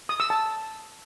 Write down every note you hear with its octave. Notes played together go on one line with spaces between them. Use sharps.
D#6
E6
A5